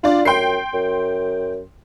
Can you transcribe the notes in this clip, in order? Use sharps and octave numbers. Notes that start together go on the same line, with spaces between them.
D4 F4 D5
F#2 G5 C6 C7
F#2